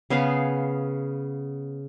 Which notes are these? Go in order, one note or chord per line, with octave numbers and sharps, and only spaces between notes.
C#3 B3 G#4 F5